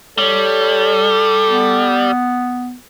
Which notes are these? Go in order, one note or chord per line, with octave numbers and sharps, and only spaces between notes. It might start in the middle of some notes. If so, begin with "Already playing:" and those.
G3 A4 C#5
B3